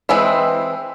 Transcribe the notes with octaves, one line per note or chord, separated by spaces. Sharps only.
E3 G#3 C4 B4